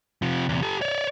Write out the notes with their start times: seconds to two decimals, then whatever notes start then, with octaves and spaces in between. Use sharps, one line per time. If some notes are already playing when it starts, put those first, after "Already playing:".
0.22 C3 F3
0.49 E2 C3
0.62 G4 A4
0.81 C#5 D5